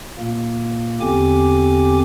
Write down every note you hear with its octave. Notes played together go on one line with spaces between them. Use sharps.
A#2 A#3
E2 D3 C4 G4 G#5 D6